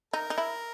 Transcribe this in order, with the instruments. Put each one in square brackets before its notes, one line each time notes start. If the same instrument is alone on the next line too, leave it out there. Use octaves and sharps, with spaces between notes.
[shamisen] D#4 [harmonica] A#4
[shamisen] D#4
E4